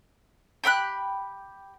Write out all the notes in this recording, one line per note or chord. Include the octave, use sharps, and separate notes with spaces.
G4 G5 B5 F#6